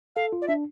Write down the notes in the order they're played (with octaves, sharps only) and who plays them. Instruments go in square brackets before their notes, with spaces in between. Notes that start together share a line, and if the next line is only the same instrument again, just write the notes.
[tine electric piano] A4 [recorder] F5
[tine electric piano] F4
[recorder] D5
[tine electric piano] D4 [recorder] E5